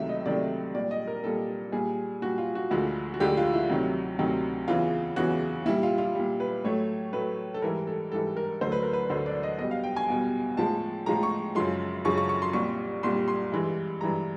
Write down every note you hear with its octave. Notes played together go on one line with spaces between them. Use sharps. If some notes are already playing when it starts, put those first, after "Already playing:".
Already playing: C#2 C3 D#3 F#3 A3 E5
D#5
C#2 C3 D#3 F#3 A3 D5
A#2 G3 D5
D#5
A#4
A#2 G3 A4
A#2 G3 G#4
A#2 G3 F#4
F4
F#4
D2 D3 F3 G#3 F#4
F#4
D2 D3 F3 G#3 G4
F4
E4
D2 C3 D#3 F#3
D2 C3 D#3 F#3
E2 C#3 E3 F4
E2 C#3 E3 F#4
A#2 G3 E4
F4
F4
A#2 G3
B4
A2 F#3 A3 C#5
A2 F#3 A3 B4
A4
G#2 E3 G3 A#4
A4
G#2 E3 G3 A4
A#4
D2 D3 F#3 A3 C5
B4
A#4
B4
D2 D3 F#3 A3 C5
D5
D#5
E2 B2 G3 D#5
F5
G5
G#5
E2 B2 G3
A2 F3 G#3 A5
A2 F3 G#3 A#5
C#6
F#2 C#3 F3 G#3 C6
F#2 C#3 F3 G#3 C#6
C#6
C#6
C6
C2 A#2 G3 C#6
C2 A#2 G3 C6
C6
G2 E3 G#3
G2 E3 G#3 A#5